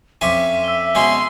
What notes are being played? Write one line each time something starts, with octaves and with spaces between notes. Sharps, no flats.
F2 C#4 E5 C6 D6 B6 D#7
E6 G7
B2 G#3 C#4 C6